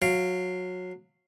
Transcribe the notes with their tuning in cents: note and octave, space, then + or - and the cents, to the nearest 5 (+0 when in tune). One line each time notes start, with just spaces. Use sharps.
F#3 -20 F5 -5